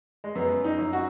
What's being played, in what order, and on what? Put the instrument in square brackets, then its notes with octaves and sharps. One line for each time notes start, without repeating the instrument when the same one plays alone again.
[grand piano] G#3
[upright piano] F#2 [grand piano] B3
[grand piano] D#4
[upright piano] F#2
[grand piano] F#4